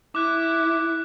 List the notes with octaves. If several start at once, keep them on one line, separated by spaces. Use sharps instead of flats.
E4 D6 F#6